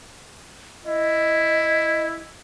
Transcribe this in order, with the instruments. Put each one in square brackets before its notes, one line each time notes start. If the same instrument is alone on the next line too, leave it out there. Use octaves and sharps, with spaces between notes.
[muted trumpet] E4 [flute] D#5